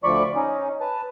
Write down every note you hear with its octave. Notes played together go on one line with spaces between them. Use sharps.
D2 F3 D5 B5 C#6
C#4 D#4
B4 A5